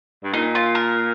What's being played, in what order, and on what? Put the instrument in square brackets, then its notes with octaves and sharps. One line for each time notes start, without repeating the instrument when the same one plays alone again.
[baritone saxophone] G2
[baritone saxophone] A#2 [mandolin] D#4
[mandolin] F4
A#4